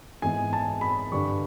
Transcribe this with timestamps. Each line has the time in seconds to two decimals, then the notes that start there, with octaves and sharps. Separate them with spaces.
0.22 G#2 E3 G#3 B3 G#5
0.53 A5
0.81 B5
1.12 G2 D3 G3 C#6